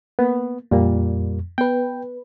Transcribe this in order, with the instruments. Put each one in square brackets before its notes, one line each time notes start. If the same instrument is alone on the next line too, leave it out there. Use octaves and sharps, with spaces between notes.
[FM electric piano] A#3 [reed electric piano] B3
[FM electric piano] F2 [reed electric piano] A#2 G3 A#3
[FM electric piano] B3 B4 [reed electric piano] G5